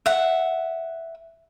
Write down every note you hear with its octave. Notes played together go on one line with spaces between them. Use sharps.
E5 F#5